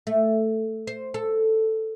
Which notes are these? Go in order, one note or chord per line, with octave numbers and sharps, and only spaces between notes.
A3
C5
A4